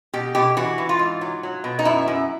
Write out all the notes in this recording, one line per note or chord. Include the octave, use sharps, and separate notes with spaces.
B2 G4
B2 G4
E3 F#4
E3
F4
G#2
F#3
F#3
B2
D#4
F#2 E4
F#2